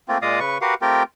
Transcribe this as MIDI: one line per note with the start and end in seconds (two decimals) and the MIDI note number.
0.08 0.18 57
0.08 0.18 58
0.08 0.18 60
0.08 0.18 65
0.22 0.40 46
0.22 0.40 56
0.22 0.40 74
0.22 0.40 75
0.22 0.40 77
0.22 0.40 87
0.40 0.58 49
0.40 0.58 71
0.40 0.58 85
0.61 0.74 66
0.61 0.74 67
0.61 0.74 70
0.61 0.74 71
0.61 0.74 77
0.61 0.74 78
0.82 1.03 57
0.82 1.03 60
0.82 1.03 65
0.82 1.03 67
0.82 1.03 70
0.82 1.03 79